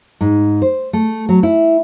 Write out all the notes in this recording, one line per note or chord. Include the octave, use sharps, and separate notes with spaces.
G#2
C5
A3
F#3
E4